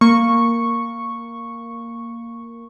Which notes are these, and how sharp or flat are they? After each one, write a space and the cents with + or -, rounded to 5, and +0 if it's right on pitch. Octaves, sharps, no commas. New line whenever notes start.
A#3 -5 C#6 -5